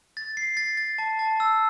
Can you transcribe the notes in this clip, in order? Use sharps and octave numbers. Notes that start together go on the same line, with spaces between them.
A6
C7
A6
A6
A5
A5
E6